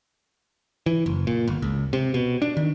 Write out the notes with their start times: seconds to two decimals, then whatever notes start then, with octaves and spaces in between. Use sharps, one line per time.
0.86 E3
1.06 F#1
1.27 A#2
1.48 G1
1.62 C#2
1.93 C3
2.14 B2
2.42 D4
2.57 D#3